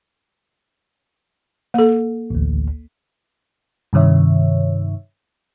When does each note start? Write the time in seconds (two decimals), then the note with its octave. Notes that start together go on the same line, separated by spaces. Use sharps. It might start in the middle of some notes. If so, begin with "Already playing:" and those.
1.74 A#3 A4
2.30 A1 D2
3.93 G2 C3 D#3 C#5 E5